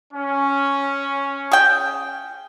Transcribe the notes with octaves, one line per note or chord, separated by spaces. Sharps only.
C#4
G#4 G5